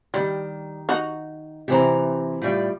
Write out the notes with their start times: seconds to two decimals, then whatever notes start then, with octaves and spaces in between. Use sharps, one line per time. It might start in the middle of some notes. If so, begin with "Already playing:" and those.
0.14 D#3 G3 G4
0.89 D#4 F#4
1.68 C3 E3 G4 C5 A#5
2.42 A2 G3 F4